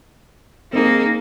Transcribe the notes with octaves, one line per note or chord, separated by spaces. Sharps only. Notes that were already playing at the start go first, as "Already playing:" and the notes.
A#3 C4 D#4 G#4